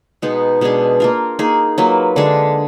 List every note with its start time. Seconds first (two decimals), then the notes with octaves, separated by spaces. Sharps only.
0.22 B2 G#3 B3 D#4
0.61 B2 G#3 D4 G#4
1.00 A#3 F4 A#4
1.39 A#3 D#4 G#4
1.78 F#3 A#3 F4 B4
2.16 D3 G#3 D4 G#4